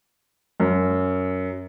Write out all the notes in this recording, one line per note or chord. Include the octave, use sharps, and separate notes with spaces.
F#2